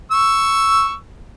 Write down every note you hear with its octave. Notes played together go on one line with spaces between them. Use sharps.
C#6 E6